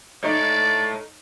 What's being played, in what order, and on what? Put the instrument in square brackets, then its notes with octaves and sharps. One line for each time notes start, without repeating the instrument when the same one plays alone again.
[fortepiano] D#4 [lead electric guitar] A4 C#5 [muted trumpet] D5